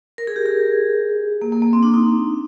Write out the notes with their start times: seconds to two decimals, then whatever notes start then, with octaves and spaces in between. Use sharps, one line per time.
0.18 A#4
0.27 G#4
0.36 G4
0.46 G#4
1.42 A#3
1.52 A#3
1.62 A#3
1.73 C4
1.83 D4
1.93 D#4